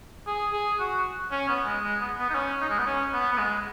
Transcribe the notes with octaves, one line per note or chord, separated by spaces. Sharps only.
G#4
G#4
F#4
C#4
B3
G#3
G#3
B3
B3
D#4
C#4
D#4
G#3
B3
C#4
B3
B3
G#3